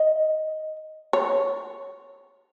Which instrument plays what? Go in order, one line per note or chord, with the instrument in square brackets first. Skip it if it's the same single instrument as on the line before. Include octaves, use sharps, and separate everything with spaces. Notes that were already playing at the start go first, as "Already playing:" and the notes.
Already playing: [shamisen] D#5
C#5